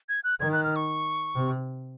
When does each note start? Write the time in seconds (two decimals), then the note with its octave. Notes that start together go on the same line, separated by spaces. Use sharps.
0.09 G#6
0.24 F#6
0.40 D#3 G#6
0.53 F#6
0.64 F6
0.76 C#6
1.35 C3